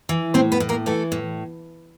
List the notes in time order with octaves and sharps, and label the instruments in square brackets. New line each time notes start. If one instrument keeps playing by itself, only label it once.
[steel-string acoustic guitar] E3
A2 C4 C5
B3 B4
A2
A#3 A#4
E3 A3 A4
A2